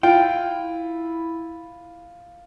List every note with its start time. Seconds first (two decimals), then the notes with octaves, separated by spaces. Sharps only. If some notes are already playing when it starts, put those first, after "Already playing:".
0.03 E4 F4 G5